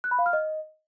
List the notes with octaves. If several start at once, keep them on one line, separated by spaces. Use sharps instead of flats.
F#6
B5
F5
F6
D#5